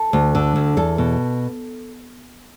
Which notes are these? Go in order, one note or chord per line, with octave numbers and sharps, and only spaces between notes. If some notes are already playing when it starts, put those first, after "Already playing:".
Already playing: A4
D2
D3
D2
E2 A4
B2